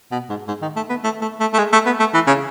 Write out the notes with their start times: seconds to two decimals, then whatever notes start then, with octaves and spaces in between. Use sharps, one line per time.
0.12 B2
0.30 G#2
0.48 G#2
0.62 D#3
0.76 A3
0.89 B3
1.04 A3
1.22 A3
1.40 A3
1.54 A3
1.59 G#3
1.73 A3
1.86 B3
2.00 A3
2.14 E3
2.27 C#3